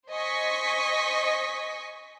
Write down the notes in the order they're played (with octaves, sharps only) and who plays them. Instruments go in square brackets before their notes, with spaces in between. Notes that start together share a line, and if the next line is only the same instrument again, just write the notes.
[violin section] C5 D#5 G#5 C#6 B6